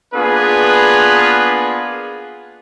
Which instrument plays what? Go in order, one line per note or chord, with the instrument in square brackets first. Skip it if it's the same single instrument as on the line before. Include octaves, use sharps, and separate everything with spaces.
[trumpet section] A#3 B3 D4 F4 G#4 B4